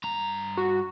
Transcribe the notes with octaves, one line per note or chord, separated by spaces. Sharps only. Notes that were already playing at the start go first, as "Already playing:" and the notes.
G2 A#5
F#4